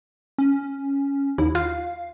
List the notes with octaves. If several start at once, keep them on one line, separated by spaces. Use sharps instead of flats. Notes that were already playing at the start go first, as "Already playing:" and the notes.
C#4
D#2 E4
F4 F5